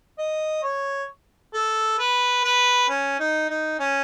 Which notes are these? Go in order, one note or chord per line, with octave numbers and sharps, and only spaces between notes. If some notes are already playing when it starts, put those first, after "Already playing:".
D#5
C#5
A4
B4
B4
C#4
D#4
D#4
C#4